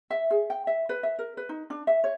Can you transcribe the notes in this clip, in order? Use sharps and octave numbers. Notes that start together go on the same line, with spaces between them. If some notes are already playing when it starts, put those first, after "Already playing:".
E5
G#4
G5
E5
B4
E5
A#4
B4
D#4
D4
E5
C#5